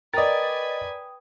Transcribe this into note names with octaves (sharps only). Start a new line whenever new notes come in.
A#4 B4 D5 D#5 G5 G#5 D#6 A6